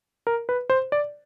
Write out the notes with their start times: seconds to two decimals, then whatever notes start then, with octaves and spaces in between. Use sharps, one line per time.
0.27 A#4
0.49 B4
0.70 C5
0.92 D5